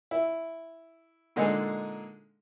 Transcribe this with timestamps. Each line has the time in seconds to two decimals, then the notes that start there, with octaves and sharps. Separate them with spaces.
0.11 E4
1.36 A#2 D3 G#3 D#4 G#4 A4